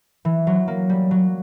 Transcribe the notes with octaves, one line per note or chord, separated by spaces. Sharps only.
E3
F#3
A#3
G3
F#3